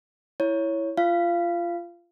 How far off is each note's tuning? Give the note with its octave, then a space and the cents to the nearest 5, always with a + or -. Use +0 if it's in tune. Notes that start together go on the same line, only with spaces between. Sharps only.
E4 +0 C#5 +0
F4 -20 F5 -20